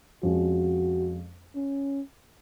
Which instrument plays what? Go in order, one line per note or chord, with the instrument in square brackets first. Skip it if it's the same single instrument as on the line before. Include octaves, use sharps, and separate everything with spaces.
[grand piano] F2 F3 G#3 C#4 [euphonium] F#4
[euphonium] C#4